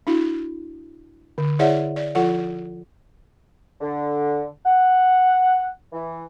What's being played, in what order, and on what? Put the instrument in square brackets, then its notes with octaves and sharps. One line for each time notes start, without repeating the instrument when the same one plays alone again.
[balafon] D4 E4 F#4
D3
E4 G#4 C#5 D5 E5 F#5
D5
F3 F4 A4 F#5
[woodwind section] D3
F#5
E3